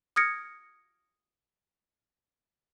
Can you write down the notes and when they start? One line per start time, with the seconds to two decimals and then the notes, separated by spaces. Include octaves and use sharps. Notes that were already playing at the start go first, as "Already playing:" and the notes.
0.16 D#6 F6 G#6 A#6 C#7 D7